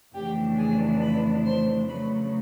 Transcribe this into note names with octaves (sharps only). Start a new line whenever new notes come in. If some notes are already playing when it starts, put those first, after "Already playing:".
F2 C#3 E3 A3 D4 G4 G5
G#4 G#5
B4 B5
C5 C6
C#3 F#3 A3 B4 B5